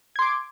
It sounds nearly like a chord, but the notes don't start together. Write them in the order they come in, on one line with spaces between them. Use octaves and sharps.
G#6 C6 D6